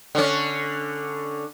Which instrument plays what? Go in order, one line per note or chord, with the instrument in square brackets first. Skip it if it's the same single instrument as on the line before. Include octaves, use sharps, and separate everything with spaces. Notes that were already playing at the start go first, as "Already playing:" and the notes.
[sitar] D3 C#4